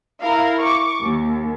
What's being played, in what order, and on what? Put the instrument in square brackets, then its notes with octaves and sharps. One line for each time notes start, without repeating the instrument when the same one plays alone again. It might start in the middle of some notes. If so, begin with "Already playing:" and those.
[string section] E4 A#4 F5
C#6 D6
D#2